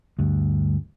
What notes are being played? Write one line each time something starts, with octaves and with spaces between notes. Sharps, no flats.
D2 G2